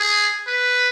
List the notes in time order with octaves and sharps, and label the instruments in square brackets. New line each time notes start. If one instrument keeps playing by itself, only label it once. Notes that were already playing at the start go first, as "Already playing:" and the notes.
Already playing: [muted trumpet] G#4
B4